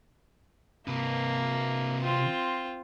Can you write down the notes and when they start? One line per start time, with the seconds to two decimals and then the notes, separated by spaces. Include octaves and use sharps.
0.87 C3 A#3 B4
2.02 C4 F4